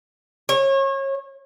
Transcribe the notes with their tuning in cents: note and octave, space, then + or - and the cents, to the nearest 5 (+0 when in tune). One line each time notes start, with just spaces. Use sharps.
C#5 -30